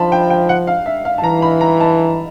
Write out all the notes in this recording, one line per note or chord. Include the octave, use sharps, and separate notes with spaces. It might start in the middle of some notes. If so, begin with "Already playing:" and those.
Already playing: F3 A5 B5 C6
G5
G5
F#5
F5
E5
F5
A5
E3 A#5
B5
A#5
A5